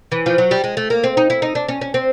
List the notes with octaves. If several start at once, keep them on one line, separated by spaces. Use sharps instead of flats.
E3
F3
F#3
G3
G#3
A3
A#3
C4
D#4
E4
D#4
D4
C#4
C#4
C4